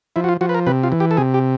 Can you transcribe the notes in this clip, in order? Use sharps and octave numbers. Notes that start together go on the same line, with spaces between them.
F3 E4
F#4
F4
F3 F#4
B4
A#4
C3 B4
F4
E3
G4
A4
C3 G#4
G4